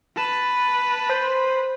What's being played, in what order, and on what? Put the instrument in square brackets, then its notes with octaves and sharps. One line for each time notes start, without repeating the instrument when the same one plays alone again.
[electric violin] B4 [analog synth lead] A5
[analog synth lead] C5